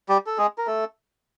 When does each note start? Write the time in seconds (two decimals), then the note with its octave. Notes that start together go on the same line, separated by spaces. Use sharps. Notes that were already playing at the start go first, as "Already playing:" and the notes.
0.09 G3 G4
0.26 A4
0.38 G#3 G#4
0.58 A#4
0.67 A3 A4